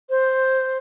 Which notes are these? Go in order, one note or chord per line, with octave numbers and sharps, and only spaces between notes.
C5